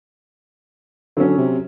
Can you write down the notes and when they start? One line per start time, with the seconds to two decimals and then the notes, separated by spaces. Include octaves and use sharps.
1.17 D3 F#3 C#4
1.38 C3